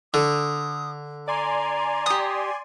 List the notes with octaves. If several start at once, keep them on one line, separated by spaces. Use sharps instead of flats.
D3 D#6
D5 G#5 A#5 C6
G4 D#6